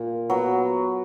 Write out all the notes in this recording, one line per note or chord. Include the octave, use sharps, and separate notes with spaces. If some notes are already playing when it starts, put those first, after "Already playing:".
Already playing: A#2
F#3 B3